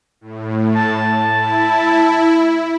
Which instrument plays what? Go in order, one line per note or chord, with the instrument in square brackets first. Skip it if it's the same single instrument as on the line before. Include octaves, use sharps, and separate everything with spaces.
[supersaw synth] A2
[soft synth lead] A5
[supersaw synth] E4